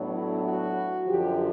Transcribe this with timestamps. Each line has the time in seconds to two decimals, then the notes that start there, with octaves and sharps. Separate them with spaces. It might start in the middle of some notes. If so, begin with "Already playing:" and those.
Already playing: A2 F#3 B3 D4
0.12 E4
0.44 F#4
1.07 F#2 D3 F3 G4